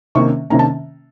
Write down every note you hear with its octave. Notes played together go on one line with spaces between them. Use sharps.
C3 D#3 A#3 C#4 C#6
C3 D#3 A#3 C#4 A#5
A5